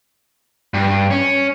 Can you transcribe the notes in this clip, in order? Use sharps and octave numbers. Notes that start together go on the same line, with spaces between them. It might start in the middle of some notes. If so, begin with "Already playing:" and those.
G2
C#4